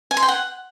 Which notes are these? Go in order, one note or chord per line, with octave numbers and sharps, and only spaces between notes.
G#5
C6
G5
F#5